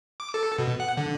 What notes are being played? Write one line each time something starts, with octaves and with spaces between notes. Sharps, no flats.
D6
A4
B2
F#5
D3